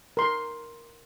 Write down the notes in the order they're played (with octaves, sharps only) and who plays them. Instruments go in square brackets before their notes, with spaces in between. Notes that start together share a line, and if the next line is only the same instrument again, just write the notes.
[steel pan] A#4 C6